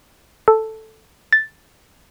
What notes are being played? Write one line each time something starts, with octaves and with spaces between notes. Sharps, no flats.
A4
A6